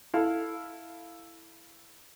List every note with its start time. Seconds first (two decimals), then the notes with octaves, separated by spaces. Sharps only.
0.14 E4 A4 F5